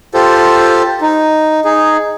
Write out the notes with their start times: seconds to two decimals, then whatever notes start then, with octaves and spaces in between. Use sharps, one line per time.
0.14 F4 G4 A4 C5
1.01 D#4
1.65 D#4 G#4